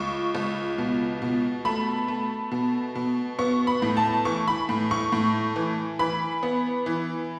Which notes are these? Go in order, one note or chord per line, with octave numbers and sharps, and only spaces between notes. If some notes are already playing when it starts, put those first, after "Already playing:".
Already playing: C#2 C#6
C#2
B2
B2
A3 B5
A3
B2
B2
B3 C#6
B5
A2
A5
E3 C#6
B5
A2
C#6
A2
E3
E3 B5
B3
E3